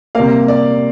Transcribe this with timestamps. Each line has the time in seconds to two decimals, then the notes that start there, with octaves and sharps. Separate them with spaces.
0.15 C3 G3 A#3 F5
0.48 D5